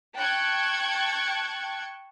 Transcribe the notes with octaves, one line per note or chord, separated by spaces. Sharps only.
G5 A5 C#6 F#6 G#6